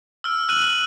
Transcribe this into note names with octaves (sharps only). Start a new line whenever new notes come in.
E6 F6
E6 F#6 D#7 F#7
F#7